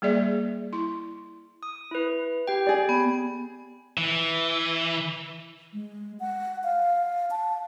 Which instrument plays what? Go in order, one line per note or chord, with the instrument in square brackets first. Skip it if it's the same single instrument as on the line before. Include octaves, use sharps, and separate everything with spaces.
[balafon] G3 A#3 G#4 D5 E5
E4 C6
[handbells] D#6
E4 B4
G4 G5
[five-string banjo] G#4 D5
[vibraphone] B3
[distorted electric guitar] E3
[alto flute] G#3
F#5
F5
A5